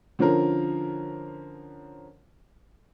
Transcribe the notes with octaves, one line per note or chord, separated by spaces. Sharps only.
D3 F3 C#4 F4 A#4